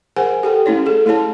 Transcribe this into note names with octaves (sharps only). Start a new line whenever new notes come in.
G#4 A#4 C5 F#5 G#5
G4 A4 G5
A3 C#4 E4 C#5
G#4 A4
A3 E4 G#4 C#5 A5